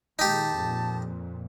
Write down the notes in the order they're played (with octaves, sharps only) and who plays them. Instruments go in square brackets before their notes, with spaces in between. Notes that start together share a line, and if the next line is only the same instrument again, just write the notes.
[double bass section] A#2 D#3 G#3 [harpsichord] D#4 G4 [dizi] A5
[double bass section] F2 A#2